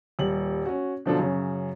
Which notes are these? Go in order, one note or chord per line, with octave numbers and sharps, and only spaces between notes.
D#1 G3 F#7
C#4 F#4
B2 D3 F3 F#3 D4 A4
F#2 C#3 C#4